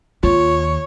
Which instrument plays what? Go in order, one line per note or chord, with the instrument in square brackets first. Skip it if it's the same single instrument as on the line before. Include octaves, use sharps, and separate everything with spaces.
[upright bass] D#2 [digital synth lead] F4 [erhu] C#5